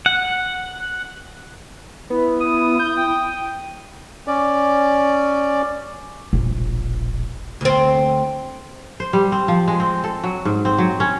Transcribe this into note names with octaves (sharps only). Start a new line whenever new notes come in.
F#5
B3 E4
D#6
G6
G5
C#4 D5
E1 A#1
D2 C4
C5
G3
C4
F3
G#3
C4
A4
F#3
G#2
C4
F#3
C#4